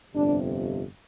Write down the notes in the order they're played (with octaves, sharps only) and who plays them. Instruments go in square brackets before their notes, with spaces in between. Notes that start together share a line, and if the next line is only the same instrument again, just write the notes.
[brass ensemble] G1 F2 C3 D4